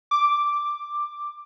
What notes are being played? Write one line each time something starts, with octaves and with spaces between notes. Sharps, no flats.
D6